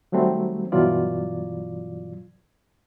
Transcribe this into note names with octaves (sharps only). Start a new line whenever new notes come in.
D#3 F#3 G3 A3 C4
G2 B2 E3 F#3 F4 D5